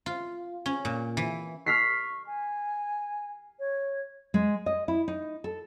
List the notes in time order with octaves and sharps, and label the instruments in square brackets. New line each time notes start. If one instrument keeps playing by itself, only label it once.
[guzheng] F4
C#4
A#2
E3
[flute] C#6 [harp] F6 B6 C7
[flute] G#5
C#5
[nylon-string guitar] G#3
D#5
E4
D#4
A4